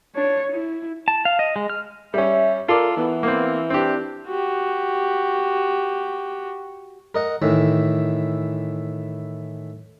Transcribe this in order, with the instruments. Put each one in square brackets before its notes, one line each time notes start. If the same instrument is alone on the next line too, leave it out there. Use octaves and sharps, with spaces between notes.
[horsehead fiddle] D4 C#5
E4
[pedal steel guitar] A5
F5
D#5
G#3
F6
[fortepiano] G3 C#4 [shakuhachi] E5
[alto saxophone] F4 [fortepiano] A4 D5 [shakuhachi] A#4
[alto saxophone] E3 [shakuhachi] B3
[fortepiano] A#3 C4
[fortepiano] C4 G4 [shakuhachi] D4
[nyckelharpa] F#4 G4
[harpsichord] A#4 D#5 F#5
A2 D#3 E3